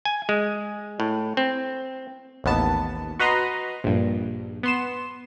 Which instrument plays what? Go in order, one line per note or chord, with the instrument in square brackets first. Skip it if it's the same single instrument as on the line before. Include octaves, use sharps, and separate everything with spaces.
[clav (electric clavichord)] G#5
G#3
A2
C4
[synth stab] A1 D#2 B3 A5
F#4 B4 D#5 A#5 C6
A#1 G2
B3 C6 E7